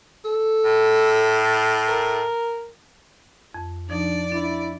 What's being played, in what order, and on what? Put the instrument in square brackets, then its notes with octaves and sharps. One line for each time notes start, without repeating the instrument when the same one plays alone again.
[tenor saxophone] A4
[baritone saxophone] A2
[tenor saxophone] A#4
[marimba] F2
[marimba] F3 D#4 [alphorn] D4 [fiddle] D5
[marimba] D4 [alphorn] E4